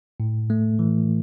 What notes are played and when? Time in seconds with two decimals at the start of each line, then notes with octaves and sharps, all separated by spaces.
0.20 A2
0.50 A3
0.79 E3